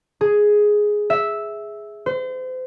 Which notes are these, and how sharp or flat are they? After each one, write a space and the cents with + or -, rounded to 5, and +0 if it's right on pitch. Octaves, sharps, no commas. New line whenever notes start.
G#4 +5
E5 -5
C5 -35